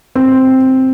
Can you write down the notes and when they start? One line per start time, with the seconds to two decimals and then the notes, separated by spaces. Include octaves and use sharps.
0.16 C4